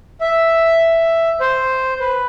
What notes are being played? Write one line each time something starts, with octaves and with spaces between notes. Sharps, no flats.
E5
C5
B4